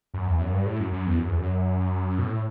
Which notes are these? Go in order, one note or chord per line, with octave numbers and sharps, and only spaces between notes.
F#2
E2
F#2
G2
A2
F#2
F#2
E2
F#2
E2
F#2
B2
A2